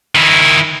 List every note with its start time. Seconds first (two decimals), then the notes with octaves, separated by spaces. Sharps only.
0.15 D#3 E4